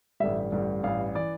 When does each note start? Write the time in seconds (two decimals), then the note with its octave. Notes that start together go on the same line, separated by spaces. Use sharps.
0.20 A1 G2 D3 G3 E5
0.52 A1 G2 D3 G3
0.83 A1 G2 E3 F5
1.15 E3 D5